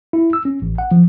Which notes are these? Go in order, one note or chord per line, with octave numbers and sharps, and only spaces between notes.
E4
E6
C#4
A1
F#5
F3